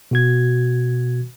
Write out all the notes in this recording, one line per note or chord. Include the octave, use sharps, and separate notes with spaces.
B2 F#4 G#6